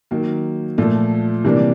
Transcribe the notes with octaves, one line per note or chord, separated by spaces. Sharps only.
D#3 F#3 A#3
A#2 F3 A3
C3 E3 G3 A#3 D4